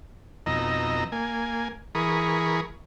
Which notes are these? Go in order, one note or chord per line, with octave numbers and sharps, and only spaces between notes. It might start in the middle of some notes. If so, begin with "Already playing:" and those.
F2 B2 D#4 D#5 A#5 E6
A#3 G#5
E3 G#4 A#4 B5 C#6 D#6